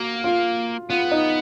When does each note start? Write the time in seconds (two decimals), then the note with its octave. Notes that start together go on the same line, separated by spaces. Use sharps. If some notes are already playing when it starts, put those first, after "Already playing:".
Already playing: A#3 F#4
0.24 F4
0.89 B3 F4
1.11 D#4